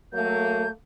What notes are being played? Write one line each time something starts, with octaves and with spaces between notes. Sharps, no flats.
F#3 A3 A#3 G6